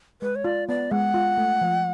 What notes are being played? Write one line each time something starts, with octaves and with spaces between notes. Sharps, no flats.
G#3 B4
C#5
F4 D5
B3 D5
G#3 F#5
F4
A3
F3